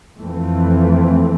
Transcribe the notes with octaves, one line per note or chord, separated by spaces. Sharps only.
F2 E3 A3 C4